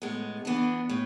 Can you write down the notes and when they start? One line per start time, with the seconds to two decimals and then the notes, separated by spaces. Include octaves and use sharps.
0.02 A2 G#3 B3
0.45 E3 B3 D4
0.89 A2